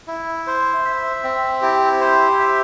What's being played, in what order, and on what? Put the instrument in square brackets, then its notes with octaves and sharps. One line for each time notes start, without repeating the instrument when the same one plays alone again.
[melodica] E4
C5
E5
C4
[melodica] E4 [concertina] G4
[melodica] C5
E5